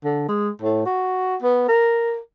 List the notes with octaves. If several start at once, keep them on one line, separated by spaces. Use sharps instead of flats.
D3
G#3
A2
F#4
B3
A#4